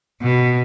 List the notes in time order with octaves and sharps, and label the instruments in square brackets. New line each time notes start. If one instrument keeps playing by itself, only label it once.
[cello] B2